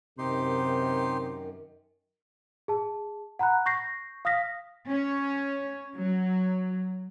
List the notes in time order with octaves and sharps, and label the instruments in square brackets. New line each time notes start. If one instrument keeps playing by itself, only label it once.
[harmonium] F#2 D#3 [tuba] C3 [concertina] D#4 G4 C6
[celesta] G#4 A5
F#5 A#5 B5 F#6
C#6 G6 A#6 C7
F5 D#6 F6 A#6 B6
[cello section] C#4
F#3